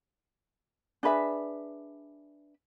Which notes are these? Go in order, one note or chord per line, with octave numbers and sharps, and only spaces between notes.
D4 G#4 B4 E5